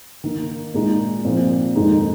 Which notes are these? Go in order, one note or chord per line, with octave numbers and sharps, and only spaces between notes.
D#3 A#3 D#4
A#2 G#3 D#4
A#2 F3 C4
F2 D#3 G#3 D#4